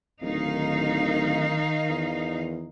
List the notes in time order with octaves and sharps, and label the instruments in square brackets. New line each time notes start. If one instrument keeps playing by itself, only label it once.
[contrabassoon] D1 [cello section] D#3 D#4 F5
[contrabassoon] E2